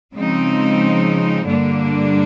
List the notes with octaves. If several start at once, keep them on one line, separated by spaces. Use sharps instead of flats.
C#3 F3 G#3 C4 D#4
G2 D3 G3 A#3 D4